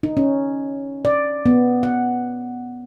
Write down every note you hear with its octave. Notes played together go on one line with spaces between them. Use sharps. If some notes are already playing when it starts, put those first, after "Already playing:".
D#4
C#4
D5
B3
F#5